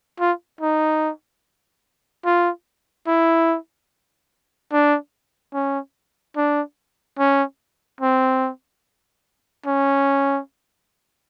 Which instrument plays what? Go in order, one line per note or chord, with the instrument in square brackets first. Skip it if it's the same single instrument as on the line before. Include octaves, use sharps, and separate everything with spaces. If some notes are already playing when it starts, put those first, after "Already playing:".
[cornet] F4
D#4
F4
E4
D4
C#4
D4
C#4
C4
C#4